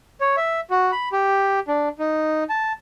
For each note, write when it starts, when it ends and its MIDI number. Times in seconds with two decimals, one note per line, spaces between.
0.21 0.36 73
0.37 0.60 76
0.70 0.91 66
0.92 1.09 83
1.12 1.60 67
1.68 1.89 62
1.99 2.44 63
2.49 2.73 81